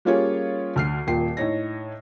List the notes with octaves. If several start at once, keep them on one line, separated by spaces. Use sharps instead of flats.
G3 A#3 C#4 F4 G#4 C#5
D2 F6 C7
D#1 A#2 G5 C7
A2 D#4 C#5 A#6